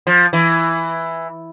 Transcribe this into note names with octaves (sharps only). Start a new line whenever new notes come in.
F3
E3